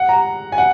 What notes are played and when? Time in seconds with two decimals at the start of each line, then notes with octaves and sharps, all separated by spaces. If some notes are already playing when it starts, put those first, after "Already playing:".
Already playing: F#5
0.09 A#5
0.52 G#5
0.58 F#5